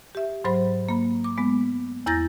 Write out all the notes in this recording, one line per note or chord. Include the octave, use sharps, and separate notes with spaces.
G4 E5
G#2 F#3 C5 B5
A#3 B5
D6
G#3 B3
E2 E4 A#5 G6 A6 A#6